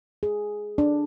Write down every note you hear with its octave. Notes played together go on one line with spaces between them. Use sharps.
G#4
D4